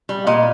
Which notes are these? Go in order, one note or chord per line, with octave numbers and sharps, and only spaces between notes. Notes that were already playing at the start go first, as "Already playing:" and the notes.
G3
A#2 D#5